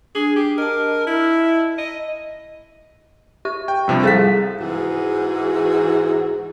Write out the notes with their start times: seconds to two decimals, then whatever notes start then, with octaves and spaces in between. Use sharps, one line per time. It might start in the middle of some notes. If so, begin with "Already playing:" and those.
0.15 D4 G#4
0.36 G4
0.58 A#4 D#5 A5
1.07 E4
1.78 D#5
3.45 G4 C#6
3.68 G5
3.88 G2 C3 F3
4.03 G3 G#4 A4 A6 B6
4.61 G#2 E3 F#4 G#4